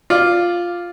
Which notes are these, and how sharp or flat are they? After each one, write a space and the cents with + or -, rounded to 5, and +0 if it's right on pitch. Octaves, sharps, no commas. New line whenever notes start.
F4 +0 D5 +0